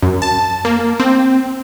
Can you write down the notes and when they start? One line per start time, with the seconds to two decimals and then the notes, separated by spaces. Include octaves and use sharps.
0.02 F#2
0.22 A5
0.65 A#3
1.00 C4